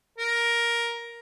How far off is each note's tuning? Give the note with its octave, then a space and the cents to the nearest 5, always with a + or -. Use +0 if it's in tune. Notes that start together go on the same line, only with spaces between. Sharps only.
A#4 +10